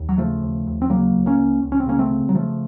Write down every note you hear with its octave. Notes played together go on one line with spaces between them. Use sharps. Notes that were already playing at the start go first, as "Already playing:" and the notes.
Already playing: D#2
F#3
C#3 F3 A3
D#2
D#2
C4
C#3 F#3 A#3
C#2
A#3 C#4
C#2
C#2
C#4
C4
C#3 A#3 C#4
A3 C4
C#3
F#3
C#3 F3 A3